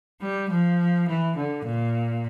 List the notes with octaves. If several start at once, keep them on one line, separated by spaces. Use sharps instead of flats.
G3
F3
E3
D3
A#2